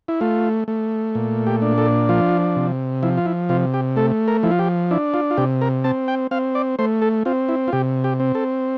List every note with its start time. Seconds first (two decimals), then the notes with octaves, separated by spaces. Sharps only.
0.08 E4
0.21 A3 F4
0.68 A3
1.15 A#2
1.47 G4
1.62 D4
1.78 A4
2.09 F3 F4
2.56 C3
3.03 F3 E4
3.17 F4
3.26 E4
3.49 C3 F4
3.74 G4
3.96 A3 A4
4.28 A#4
4.43 F3 E4
4.51 F4
4.59 G4
4.91 D4 E4
5.14 F4
5.31 F4
5.37 C3 G4
5.61 A#4
5.84 C4 A5
6.08 G5
6.31 C4 F5
6.55 D5
6.79 A3 C5
7.02 A4
7.25 C4 F4
7.49 E4
7.68 F4
7.72 C3 G4
8.04 G4
8.20 C4
8.35 A4